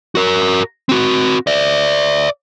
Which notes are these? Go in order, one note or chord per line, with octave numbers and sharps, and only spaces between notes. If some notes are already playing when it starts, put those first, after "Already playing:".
F#4 A#4
C4 F#4
D5 E5